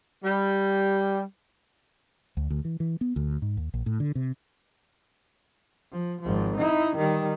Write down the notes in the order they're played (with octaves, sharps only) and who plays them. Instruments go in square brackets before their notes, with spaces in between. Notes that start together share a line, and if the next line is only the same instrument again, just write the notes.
[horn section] G3
[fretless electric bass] D2
D2
E3
E3
B3
D2
G#2
D#2
A#1
A2
D3
C3
[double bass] F3
G#1 F3
D#4 E4
D#3 G3